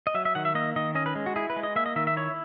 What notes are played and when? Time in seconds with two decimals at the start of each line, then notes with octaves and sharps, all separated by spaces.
0.07 D#5
0.14 F#3 E5
0.25 E5
0.35 D#3 F#5
0.45 E5
0.55 A#3 D#5
0.76 D#3 D#5
0.95 C#4 D#5
1.06 B4
1.15 G#3
1.26 F#4
1.36 E4 G#4
1.50 B4
1.56 G#3
1.63 D#5
1.76 A#3 E5
1.86 D#5
1.96 D#3 E5
2.07 E5
2.17 E4 C#5